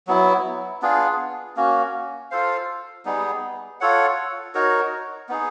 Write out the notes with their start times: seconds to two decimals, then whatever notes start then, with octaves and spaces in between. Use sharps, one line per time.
0.07 F#3 B3 E4
0.82 B3 D4 F4 G#4
1.56 A#3 C#4 F#4
2.31 F4 A4 C5 F5
3.05 G3 B3 D#4 G#4
3.81 F4 A4 C#5 F#5
4.55 D#4 F#4 A#4 C#5
5.29 B3 D#4 G#4